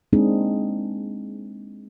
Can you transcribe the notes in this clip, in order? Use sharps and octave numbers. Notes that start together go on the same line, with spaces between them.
G#3 A#3 C4 D4 D#4 G#4